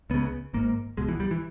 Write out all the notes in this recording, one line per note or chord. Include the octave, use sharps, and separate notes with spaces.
C#2 C#3 B3
G#1 G#2 A#3
C#2 B2 G#3
E3
G3
E3